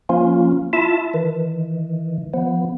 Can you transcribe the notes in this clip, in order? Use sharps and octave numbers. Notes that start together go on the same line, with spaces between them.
F3 A#3 C#4 F4
E4 F4 E5 A5
D#3 E3
F3 B3